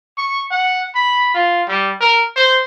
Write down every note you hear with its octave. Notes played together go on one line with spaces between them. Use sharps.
C#6
F#5
B5
F4
G3
A#4
C5